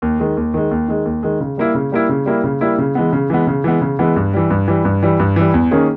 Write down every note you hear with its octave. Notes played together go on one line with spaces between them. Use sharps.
D#2
D#3 G#3
D#2
D#3 G#3
D#2
D#3 G#3
D#2
D#3 G#3
C#3
G3 A#3 E4
C#3
G3 A#3 E4
C#3
G3 A#3 E4
C#3
G3 A#3 E4
C#3
E3 G#3 B3
C#3
E3 G#3 B3
C#3
E3 G#3 B3
C#3
E3 G#3 B3
G2
E3 G3
G2
E3 G3
G2
E3 G3
G2
E3 G3
E2
D#3 A#3 C#4 G#4